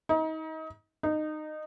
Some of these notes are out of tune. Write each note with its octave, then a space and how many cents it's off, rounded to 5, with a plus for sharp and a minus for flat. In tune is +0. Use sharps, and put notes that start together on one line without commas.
D#4 +30
D#4 -20